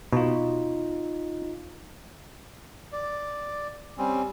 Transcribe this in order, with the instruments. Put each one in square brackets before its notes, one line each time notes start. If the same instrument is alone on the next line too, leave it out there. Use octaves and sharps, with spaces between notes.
[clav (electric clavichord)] B2 [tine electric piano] D#4 F4
[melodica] D5
G3 C4 C#4